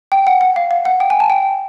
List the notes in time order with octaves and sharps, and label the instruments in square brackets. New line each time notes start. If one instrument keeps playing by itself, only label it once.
[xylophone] G5
F#5
F#5
F5
F5
F#5
G5
G#5
A5
G5